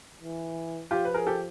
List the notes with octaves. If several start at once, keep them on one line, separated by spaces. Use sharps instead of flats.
E3
F3 F4 G4
B4
G#4 A#4
G4 A4